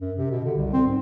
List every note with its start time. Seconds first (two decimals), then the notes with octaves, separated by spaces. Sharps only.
0.01 F#2
0.17 C3
0.31 B2
0.44 D3
0.57 C2
0.73 C4
0.87 G#2